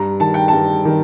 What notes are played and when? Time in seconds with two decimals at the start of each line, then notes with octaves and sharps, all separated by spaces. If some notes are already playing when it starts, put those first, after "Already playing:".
Already playing: G2 A#5
0.20 D#3 A5
0.34 G5
0.48 G2 A5
0.85 D#3